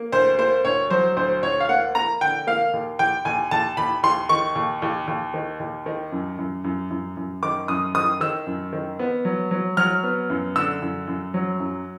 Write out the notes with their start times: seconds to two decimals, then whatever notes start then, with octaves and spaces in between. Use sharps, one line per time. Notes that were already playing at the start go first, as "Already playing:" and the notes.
Already playing: A#3
0.12 D2 C5
0.38 A#3 C5
0.65 D2 C#5
0.90 F#3 C5
1.17 D2 C5
1.43 D2 C#5
1.60 F5
1.69 A#3 F#5
1.95 A#3 A#5
2.21 D3 G5
2.47 A#3 F5
2.73 D#2
2.99 D#2 G5
3.25 D#2 G#5
3.51 D#2 A5
3.77 D#2 B5
4.03 D#2 C6
4.29 D#3 C#6
4.55 D#2
4.82 D#2
5.08 D#2
5.34 D#3
5.60 D#2
5.86 D#3
6.12 F#2
6.38 F#2
6.64 F#2
6.90 F#2
7.17 F#2
7.43 D#3 D6
7.68 F#2 D#6
7.94 D#3 D#6
8.21 D#3 E6
8.47 F#2
8.73 D#3
8.99 B3
9.25 F#3
9.51 F#3
9.77 F#3 F6
10.03 B3
10.30 F#2
10.56 D3 E6
10.82 F#2
11.08 F#2
11.34 F#3
11.60 F#2